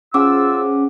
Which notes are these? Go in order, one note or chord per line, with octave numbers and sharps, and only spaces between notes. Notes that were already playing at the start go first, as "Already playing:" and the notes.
C#4 F4 G#4 C5 F#5 D6 E6